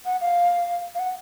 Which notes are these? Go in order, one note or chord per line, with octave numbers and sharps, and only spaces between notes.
F#5
F5
F5
F#5